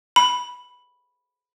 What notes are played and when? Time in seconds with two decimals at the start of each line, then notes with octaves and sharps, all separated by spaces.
0.16 B5